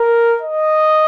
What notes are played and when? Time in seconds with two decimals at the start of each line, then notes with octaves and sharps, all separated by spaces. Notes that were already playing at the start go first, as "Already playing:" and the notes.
Already playing: A#4
0.42 D#5